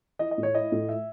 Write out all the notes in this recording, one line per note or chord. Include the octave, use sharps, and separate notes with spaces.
E4 D#5
D#5
A2
C#5
E4 D#5
A2
E5